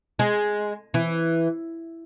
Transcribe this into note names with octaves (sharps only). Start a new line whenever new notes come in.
G#3
E3